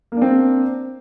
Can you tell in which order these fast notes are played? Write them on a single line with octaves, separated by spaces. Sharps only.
A#3 D4 C4